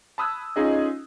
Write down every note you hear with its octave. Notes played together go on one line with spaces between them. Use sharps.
A5 B5 D#6 E6 F#6 G#6
C#4 D#4 F4 G#4 A4 D#5